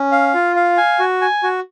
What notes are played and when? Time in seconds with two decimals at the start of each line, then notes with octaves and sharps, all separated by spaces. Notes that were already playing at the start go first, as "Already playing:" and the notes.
Already playing: C#4
0.12 F5
0.34 F4
0.56 F5
0.77 G#5
0.99 F#4
1.21 G#5
1.43 F#4